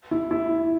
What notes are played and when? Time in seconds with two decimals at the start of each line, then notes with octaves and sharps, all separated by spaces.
0.11 E4
0.31 E4